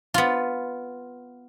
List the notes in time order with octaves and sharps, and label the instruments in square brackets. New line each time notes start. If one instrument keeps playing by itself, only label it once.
[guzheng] B3 F4